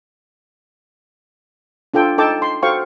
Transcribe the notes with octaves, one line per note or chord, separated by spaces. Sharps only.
D4 F4 A4 G5
D#4 A4 G5 A5 D6
C6
F#4 A4 C5 F5 G5 C#6